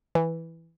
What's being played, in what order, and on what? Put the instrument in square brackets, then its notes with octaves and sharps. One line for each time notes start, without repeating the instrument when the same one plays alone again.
[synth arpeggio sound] E3